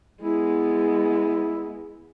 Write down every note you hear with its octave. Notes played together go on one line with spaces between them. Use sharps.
G#3 B3 E4